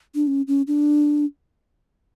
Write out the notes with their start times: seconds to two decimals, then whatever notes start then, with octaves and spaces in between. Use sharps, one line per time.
0.15 D4
0.27 C#4
0.48 C#4
0.67 D4